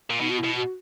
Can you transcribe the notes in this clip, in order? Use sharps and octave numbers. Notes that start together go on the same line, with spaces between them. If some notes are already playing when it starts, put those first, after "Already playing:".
A#2
B2 D#4
F#4
E4
B2
F#4